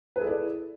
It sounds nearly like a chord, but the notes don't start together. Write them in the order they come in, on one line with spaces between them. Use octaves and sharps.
B4 G#4 A4 E4 D5